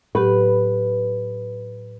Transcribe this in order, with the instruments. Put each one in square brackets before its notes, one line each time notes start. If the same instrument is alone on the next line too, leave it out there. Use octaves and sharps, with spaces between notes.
[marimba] A2 F#3 G4 [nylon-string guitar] B4